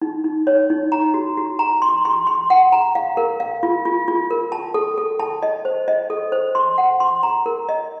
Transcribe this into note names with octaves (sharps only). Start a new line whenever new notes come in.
D#4
D#4
C#5
D#4
A#5
F#4
F#4
A#5
C6
C6
C6
F#5
A#5
F5
A#4
F5
F4
F4
F4
A#4
A5
A4
A4
A5
D#5
C5
D#5
A4
C5
C6
F#5
C6
A#5
A#4
D#5